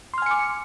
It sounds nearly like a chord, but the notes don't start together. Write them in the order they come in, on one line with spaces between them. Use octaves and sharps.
C6 F6 G#5 C#7 D6